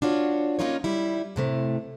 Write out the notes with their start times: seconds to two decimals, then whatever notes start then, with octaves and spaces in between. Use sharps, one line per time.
0.02 D4 F4 F#4 C#5
0.59 A#3 C#4 D#4 F4 A#4 C#5
0.84 G3 E4
1.36 A2 C3 A3